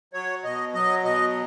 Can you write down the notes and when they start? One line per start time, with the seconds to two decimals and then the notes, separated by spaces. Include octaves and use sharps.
0.13 F#3 C#5
0.44 B2 D#5
0.74 F#3 D#5
1.04 B2 D#5